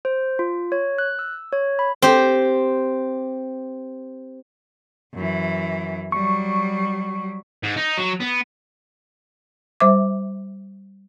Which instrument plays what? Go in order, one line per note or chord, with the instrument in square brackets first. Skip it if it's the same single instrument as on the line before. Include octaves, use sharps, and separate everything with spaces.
[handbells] C5
F4
C#5
F#6
E6
C#5
B5
[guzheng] C4 G4
[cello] F#2 E3
[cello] F#3 G3 [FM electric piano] C#6
[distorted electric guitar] G#2
D#4
F#3
B3
[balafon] G3 C5 E5 D6